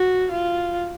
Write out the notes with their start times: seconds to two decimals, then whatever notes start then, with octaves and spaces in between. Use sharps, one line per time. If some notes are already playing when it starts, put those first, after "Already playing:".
Already playing: F#4
0.32 F4